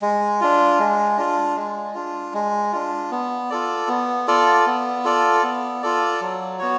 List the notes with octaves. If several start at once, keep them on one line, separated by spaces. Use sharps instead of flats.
G#3
D4 F4
G#3
D4 F4
G#3
D4 F4
G#3
D4 F4
B3
F4 A4 D5
B3
F4 A4 D5
B3
F4 A4 D5
B3
F4 A4 D5
F#3
B3 F#4 C#5